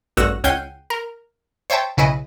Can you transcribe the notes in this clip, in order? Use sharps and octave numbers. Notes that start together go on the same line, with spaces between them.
A1 G2 F#4 E6 A#6
C#2 C#4 F#5 G5 C7 D#7
A#4
C5 C#5 E5 G5 A5
B1 C#3 E4 B4 D#5